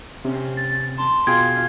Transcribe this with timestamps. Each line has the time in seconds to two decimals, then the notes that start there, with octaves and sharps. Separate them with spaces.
0.25 C3 C4 C#4
0.57 A6
0.98 A5 C6
1.27 B2 F4 G#4 G5 G#6